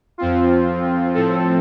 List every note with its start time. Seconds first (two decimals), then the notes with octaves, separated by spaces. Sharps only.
0.18 F2 F3 C4 F4
1.14 A2 F3 C4 A4